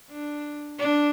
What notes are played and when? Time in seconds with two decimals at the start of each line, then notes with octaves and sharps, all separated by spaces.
0.11 D4
0.79 D4